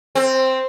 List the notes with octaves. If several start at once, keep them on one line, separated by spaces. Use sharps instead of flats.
C4